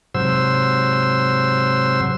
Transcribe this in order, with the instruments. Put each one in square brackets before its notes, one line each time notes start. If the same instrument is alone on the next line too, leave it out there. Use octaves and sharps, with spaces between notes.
[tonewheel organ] G#2 C3 F#3 C5 E6